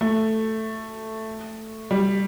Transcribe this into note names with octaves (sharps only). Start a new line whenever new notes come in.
A3
G3